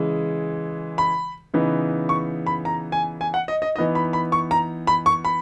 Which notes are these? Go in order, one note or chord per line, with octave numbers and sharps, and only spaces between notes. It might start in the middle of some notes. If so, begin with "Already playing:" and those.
Already playing: C#3 E3 G#3
B5
C#3 E3 B3 D#4
C#6
B5
A#5
G#5
G#5
F#5
D#5
D#5
E3 B3 D#4 D#5
B5
B5
C#6
A#5
B5
C#6
B5